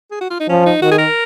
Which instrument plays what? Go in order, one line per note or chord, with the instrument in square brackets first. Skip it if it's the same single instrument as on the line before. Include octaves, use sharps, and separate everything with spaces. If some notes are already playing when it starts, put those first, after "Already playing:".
[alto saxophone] G#4
F#4
F4
D#4
[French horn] F3 [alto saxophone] C#4
[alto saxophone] D#4
[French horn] D#3 [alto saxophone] F#4
[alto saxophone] G#4
A#4